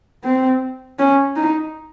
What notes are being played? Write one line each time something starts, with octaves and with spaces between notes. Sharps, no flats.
C4
C#4
D#4